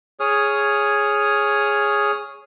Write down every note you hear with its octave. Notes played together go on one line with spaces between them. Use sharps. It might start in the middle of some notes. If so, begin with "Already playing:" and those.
G#4 C#5 D#6 F6